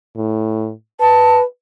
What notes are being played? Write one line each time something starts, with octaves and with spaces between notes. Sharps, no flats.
A2
B4 A5